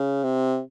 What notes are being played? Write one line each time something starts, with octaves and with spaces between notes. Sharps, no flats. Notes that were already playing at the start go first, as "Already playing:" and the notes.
Already playing: C#3
C3